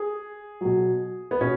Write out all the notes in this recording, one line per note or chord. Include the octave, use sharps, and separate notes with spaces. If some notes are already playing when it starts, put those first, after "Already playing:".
Already playing: G#4
B2 F#3
B3
B2 C#4